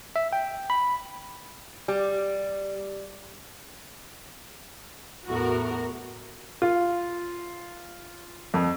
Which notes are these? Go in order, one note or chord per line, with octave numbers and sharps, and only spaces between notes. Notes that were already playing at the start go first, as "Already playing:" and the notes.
E5
G5
B5
G3
E2 A2 F#4 A4 A#4
F4
F2